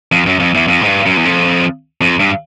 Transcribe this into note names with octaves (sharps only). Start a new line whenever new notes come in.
F2
F#2
F2
E2
F2
G#2
G2
F#2
E2
F2
F2
G2